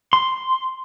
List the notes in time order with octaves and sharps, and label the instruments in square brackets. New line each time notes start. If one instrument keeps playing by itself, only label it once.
[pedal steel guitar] C6